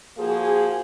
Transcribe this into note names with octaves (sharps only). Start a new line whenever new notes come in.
F3 A#3 F#4 G#4